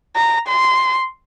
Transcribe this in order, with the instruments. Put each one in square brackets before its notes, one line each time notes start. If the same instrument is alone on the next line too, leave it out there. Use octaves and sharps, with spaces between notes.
[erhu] A#5
C6